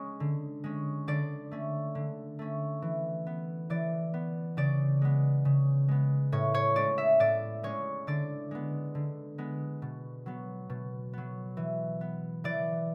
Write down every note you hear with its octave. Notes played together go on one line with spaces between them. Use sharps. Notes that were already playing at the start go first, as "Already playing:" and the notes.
Already playing: G#3 C#4
D3
G#3 C#4
D3 D5
A3 C#4
D3
A3 C#4
E3
B3
E3 D5
B3
C#3 D5
G#3 B3
C#3
G#3 B3
A2 C#5
C#5
G#3 C#4 D5
E5
A2 D5
G#3 C#4 C#5
D3 D5
G#3 B3
D3
G#3 B3
B2
F#3 B3
B2
F#3 B3
E3
B3
E3 D5